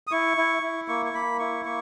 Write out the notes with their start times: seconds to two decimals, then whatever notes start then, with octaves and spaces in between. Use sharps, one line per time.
0.07 D#6
0.11 E4 C#6
0.37 E4
0.63 E4
0.88 A#3 C#6
1.06 C#6
1.14 A#3 B5
1.39 E4 C#6
1.65 A#3 C#6